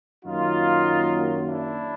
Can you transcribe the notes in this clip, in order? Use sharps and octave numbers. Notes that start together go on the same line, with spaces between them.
F#2 D#3 F#3 A#3 D#4 F4
D4 E4